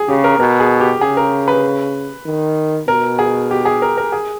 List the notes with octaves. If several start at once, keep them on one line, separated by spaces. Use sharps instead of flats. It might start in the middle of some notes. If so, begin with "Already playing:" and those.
Already playing: G#4
C#3 G4
A#4
B2 A#4
G#4
G4
C#3 G#4
A#4
B4
D#3
B2 A#4
G#4
G4
G#4
A#4
A#4
G#4